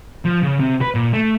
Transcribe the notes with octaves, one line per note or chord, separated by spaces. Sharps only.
F3
C#3
C3
B4
A#2
A3